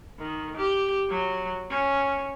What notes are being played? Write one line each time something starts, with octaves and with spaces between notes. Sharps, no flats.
D#3
G4
F#3
C#4